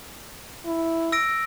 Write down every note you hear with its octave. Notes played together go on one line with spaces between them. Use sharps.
E4
E6 A#6 D7